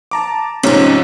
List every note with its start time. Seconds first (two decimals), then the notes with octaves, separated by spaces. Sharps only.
0.11 A5 A#5 D6
0.63 G#2 C3 F3 C#4 D#4